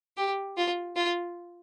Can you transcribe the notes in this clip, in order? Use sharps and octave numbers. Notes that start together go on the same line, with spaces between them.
G4
F4
F4